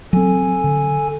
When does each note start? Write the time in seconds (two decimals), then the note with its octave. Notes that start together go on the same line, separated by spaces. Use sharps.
0.13 F#3 C4 A4 G#5
0.64 D3